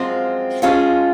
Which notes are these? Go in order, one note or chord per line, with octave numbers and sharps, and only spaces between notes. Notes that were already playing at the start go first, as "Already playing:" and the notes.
Already playing: F#2 F3 G#3 C4 F4
F3 G#3 C#4 F4 G#4